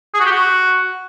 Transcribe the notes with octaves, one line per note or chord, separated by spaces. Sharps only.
G#4
F#4
G4
F#4